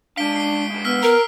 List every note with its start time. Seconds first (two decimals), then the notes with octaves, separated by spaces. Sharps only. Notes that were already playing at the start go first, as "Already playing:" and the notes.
0.17 G#3 D4 F5 B6 D7 G7
0.36 C7 G7
0.71 G#3 D4
0.85 B3 E6 F6 B6
1.03 A#4 A#5